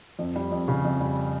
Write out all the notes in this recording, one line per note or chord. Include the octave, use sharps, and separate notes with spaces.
F2
G3
F2
C#3
F2
G3